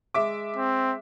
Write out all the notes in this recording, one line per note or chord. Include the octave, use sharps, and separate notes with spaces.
G#3 E5 D6
C4